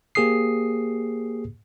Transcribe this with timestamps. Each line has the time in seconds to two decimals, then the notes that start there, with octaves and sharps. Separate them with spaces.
0.15 A#3 G4 G#4 C5 D#6 C7